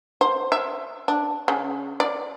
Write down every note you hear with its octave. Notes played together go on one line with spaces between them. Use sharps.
C5
E5
D4
C#3
D5